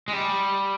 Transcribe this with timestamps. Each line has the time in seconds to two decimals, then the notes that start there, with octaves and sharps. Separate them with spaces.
0.08 G#3
0.13 G3